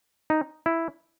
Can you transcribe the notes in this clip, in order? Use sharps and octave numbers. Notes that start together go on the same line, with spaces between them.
D#4
E4